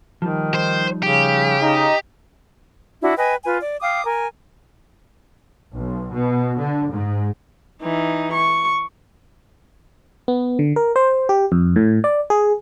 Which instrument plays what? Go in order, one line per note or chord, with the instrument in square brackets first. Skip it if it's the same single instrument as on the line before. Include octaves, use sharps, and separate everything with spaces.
[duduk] D#3 [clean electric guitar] F3 G3 D#4
[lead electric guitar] C5
[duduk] C#3 [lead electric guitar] G4
[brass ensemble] D#4 D#5
[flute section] D4 E4 F#4
B4 D#5 G5 G#5
F4 B4 G#5
D5
F5 G5 D6 D#6
A#4 G#5
[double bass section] B1
B2
D3
G#2
[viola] E3 D#4
C#6
[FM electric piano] B3
D3
A#4
C5
G4
F2
A2
D5
G#4